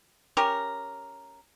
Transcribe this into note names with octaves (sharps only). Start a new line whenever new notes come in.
C#4 G4 A#4